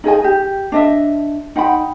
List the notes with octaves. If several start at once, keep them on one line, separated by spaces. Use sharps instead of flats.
D#4 G#4 D#5 G#5
G4
D4 D#5 E5
D#4 F#5 G5 B5